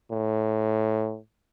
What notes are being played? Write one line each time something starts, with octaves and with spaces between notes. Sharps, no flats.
A2